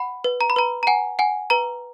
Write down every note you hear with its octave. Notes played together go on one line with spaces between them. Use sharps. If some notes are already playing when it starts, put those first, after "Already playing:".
Already playing: F#5 B5
B4
A#5
B5
B4 A#5
A#5
F#5 G#5
F#5 G#5
B4 A#5